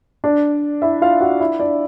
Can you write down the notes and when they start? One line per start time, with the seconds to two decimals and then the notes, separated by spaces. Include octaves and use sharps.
0.24 D4 D5
0.82 E4 E5
1.02 F4 F5
1.21 F#4 F#5
1.40 E4 E5
1.60 D4 D5